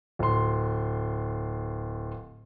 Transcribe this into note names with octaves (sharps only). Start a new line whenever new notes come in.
D1 C6